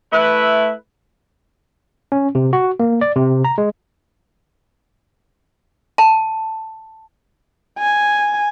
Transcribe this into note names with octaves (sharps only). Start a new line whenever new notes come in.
A3 E4 B4
C#4
C3
F#4
A#3
D5
C3
A#5
G#3
A5
G#5